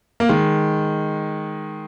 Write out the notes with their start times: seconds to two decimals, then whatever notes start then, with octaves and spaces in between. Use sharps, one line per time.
0.20 A#3
0.29 D#3 G#3